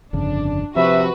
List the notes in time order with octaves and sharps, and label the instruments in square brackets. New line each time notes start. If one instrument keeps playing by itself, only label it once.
[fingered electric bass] G1 F2 C#3 [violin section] D4
[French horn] C3 [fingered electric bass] F3 [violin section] F#4 B4 [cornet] E5